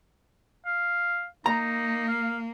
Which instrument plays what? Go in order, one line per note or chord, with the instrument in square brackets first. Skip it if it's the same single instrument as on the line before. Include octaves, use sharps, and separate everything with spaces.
[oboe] F5
[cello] A#3 [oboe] D#4 [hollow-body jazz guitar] A#5
[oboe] F5